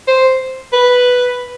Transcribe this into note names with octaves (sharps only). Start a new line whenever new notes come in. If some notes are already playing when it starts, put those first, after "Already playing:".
C5
B4